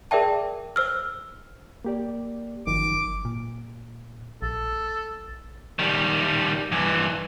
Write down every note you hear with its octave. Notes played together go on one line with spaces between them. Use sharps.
G#4 A#4 D5 E5 G5 A5
C5 E6 F6
A#3 G4 D5
G1 F#2 D#3 F3 D6
A#2
A#1 A4
D#3 G3
G2 E3